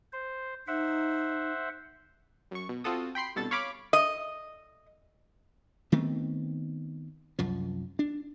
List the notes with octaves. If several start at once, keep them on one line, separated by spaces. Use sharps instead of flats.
C5
D#4 C5 E5 F#5
F#2 C#6
B2
C4 F4 F#4 A4 D#6
G5 B5 C6 C7
C2 G2 B2 A4 A6
C#5 F5 B5 D6
D#5
D#3 A3 B3 C4
C2 F#2 F3
D4